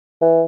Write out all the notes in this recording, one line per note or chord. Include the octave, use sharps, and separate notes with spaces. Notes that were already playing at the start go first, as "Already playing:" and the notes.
E3